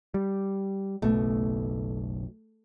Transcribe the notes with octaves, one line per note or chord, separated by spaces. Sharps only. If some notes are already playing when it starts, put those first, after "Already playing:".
G3
F#1 B1 B2 A3